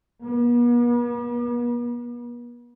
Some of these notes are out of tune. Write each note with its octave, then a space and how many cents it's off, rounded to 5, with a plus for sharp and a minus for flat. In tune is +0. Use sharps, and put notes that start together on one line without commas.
B3 -45